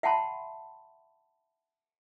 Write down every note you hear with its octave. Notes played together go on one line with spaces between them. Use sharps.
E5 F#5 G5 A5 B5 C6